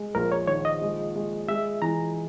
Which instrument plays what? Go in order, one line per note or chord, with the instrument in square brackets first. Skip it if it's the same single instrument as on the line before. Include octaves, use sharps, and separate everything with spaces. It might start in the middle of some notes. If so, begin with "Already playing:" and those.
Already playing: [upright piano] G#3
[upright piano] A#1 [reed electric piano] A#4
[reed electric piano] C#5
[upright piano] D#3 [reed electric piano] C#5
[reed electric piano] D#5
[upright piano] G#3
G#3
[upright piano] G#3 [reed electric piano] E5
[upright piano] E3 [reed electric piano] A#5